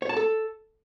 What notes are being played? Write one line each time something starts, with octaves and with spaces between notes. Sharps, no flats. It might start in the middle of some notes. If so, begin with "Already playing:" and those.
C#5
A5
A4